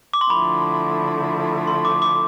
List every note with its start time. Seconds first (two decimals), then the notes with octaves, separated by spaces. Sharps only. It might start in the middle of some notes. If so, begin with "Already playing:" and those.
0.13 D6
0.21 C6
0.30 D3 F3 A3 E4 B5
1.67 C6
1.85 D6
2.02 D6